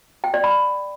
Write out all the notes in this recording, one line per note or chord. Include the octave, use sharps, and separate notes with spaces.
G5
D5
B5